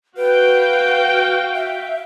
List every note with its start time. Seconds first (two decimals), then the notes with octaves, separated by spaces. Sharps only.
0.17 F#4 B4 F5 G5
1.55 E5